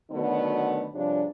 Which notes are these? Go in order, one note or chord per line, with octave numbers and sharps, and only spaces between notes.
B2 D3 D#3 F#3 A3 B3
G2 C3 F3 D4 G#4 C#5